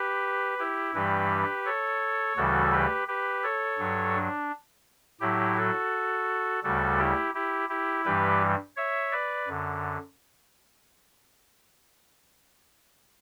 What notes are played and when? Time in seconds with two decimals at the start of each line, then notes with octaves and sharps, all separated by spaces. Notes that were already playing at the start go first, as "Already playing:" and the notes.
Already playing: G4 B4
0.59 E4 G4
0.94 G2 E3 G3 G4 B4
1.66 A4 C#5
2.37 D2 C#3 E3 G3 F#4 A4
2.72 G4 B4
3.08 G4 B4
3.43 A4 C#5
3.78 G2 F#3
4.14 D4
5.21 A2 F#3 E4 G4
5.57 F#4 A4
6.63 D2 C#3 G3 F#4 A4
6.99 E4 G4
7.35 E4 G4
7.69 E4 G4
8.05 G2 E3 G3 G4 B4
8.77 C#5 E5
9.12 B4 D5
9.48 F#2 D3